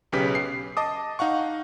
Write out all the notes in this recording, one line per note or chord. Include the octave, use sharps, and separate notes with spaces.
B1 C#3 C#4 G4 B4 B6
C7
D#5 A5 D6 D#6
D#4 F5 F#5 C#6